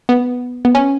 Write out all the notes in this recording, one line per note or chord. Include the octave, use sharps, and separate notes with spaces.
B3
B3
C#4